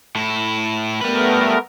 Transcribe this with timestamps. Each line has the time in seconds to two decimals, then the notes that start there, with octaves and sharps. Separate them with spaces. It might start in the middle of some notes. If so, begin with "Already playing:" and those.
0.15 A2 E4
1.01 G3 A3 B3 A#4 B4